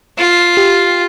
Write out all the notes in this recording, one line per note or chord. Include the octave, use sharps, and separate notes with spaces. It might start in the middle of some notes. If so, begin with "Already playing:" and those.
F4
G4